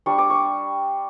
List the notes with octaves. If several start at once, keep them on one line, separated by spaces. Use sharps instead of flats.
G3 D4 C#6
D6
C#6